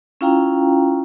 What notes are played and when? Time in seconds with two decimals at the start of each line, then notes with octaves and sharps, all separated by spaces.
0.21 C#4 E4 F4 F5 G5 A#5